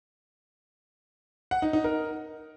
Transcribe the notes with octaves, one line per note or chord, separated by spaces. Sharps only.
F#5
D#4
D#4
A#4